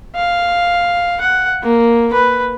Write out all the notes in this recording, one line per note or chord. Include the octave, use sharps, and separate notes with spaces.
F5
F#5
A#3
B4